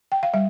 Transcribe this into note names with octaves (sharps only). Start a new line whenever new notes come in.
G5
F5
G3 E5